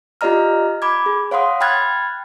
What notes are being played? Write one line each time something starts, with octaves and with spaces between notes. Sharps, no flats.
F4 G4 D5 D#5 A#5 F6
B5 D6 G#6
G#4
C#5 F5 F#5 C6 D#6
G5 B5 F6 F#6 G#6 A6